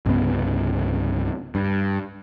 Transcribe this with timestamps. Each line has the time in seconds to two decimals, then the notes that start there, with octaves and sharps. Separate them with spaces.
0.06 C2 G2 C#3 B3
1.55 G2